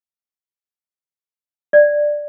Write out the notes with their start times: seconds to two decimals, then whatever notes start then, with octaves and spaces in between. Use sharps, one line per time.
1.73 D5